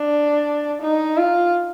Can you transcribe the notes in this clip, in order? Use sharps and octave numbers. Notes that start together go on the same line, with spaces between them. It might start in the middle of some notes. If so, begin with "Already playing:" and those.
Already playing: D4
D#4
F4